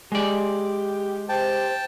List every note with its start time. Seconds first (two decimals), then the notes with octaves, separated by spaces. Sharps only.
0.12 G#3 G4 D5
1.29 G4 C5 G5 A5